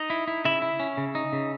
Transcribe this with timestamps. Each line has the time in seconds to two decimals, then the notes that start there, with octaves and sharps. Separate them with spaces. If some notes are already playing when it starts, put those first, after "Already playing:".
Already playing: D#4 D#5
0.10 E4
0.28 E4
0.45 C#3 E4 E5
0.62 E4
0.80 C#4
0.97 C#3
1.15 D#4
1.33 C#3